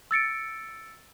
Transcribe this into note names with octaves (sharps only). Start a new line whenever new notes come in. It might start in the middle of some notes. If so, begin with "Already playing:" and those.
E6 A6 C#7 D7